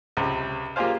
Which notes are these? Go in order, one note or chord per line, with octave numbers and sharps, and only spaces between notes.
C#2 C3
A#3 F4 G4 G#4 C5 F5